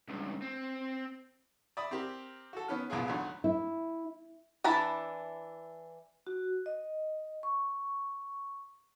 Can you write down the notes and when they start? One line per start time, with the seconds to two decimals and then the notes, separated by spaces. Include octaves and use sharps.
0.08 C#2 G2
0.42 C4
1.77 D5 E5 B5 D#6
1.91 C4 G4 A#4
2.53 F#4 A4
2.68 D#3 B3 C#4 F6
2.90 C2 A#2 B3 E4 F4 G#4
3.08 G#1 D2 D3 F#3
3.44 E4
4.64 E3 D4 E4 A5 B5
6.27 F#4
6.66 D#5
7.43 C#6